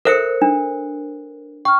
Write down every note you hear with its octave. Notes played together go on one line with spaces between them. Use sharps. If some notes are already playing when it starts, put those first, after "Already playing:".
A4 A#4 C5 E5 F#6 C#7
D4
G5 C#6 F6